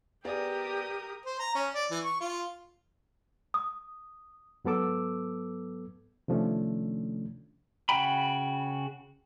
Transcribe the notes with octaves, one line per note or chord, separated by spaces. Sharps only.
B3 G4 G#4 A#4 D5 D#6
C5
A#5
C#4
D5
E3
C#6
F4
D#6
G#2 F#3 B3 A4 D6 E6
C3 D#3 F3 A3 C#4 D4
C#3 F#4 G5 B5